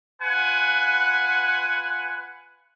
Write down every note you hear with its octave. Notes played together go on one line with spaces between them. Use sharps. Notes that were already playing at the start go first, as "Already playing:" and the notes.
F4 B4 F#5 G#5